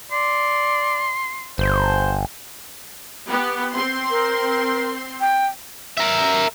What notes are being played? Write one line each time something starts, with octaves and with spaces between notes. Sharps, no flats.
D5 C6
G1 C5
B3 G4
C4 C6
A#4
G5
A#4 E5